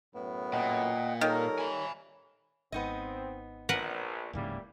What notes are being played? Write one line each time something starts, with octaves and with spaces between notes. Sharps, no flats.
F#2 A2 B3
A#2 D#5 F#5 G5
D#3 G3 A4 A#4 C#5
G#5 B5
G#1 B3 C4 D#4 D#5
A#1 A#4 B4 F#5
D1 G#2 C#3 E3 G3 A#3